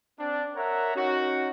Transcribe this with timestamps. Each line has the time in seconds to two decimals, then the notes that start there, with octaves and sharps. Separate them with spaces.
0.19 C4 D4
0.56 A#4 C#5 E5 F#5 A#5
0.95 C#4 D#4 F#4